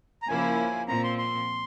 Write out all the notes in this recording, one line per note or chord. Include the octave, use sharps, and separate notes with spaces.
A#5
C#3 F3 A#3 E4 G#5
A#2 F3 C4 A#5
C6
C6